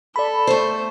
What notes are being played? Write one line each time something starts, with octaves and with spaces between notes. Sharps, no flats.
A4 D5 B5
A3 C5